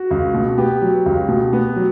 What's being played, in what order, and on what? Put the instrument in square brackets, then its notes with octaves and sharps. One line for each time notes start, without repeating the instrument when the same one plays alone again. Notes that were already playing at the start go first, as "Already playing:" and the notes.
Already playing: [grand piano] F#4
C#2
B2
B3 G4
F#3
C#2
B2
B3
F#3